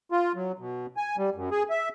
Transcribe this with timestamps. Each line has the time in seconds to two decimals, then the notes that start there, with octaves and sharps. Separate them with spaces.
0.12 F4
0.35 F#3
0.59 B2
0.97 G#5
1.18 G3
1.35 F#2
1.51 G#4
1.70 E5